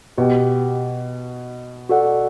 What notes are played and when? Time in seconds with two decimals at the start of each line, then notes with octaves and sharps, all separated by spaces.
0.18 B2 G4 B4 D#5 G5
1.89 F#4 A4 D5 F#5